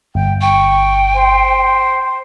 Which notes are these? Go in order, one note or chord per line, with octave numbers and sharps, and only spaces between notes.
G1 G5
G5 C#6
C5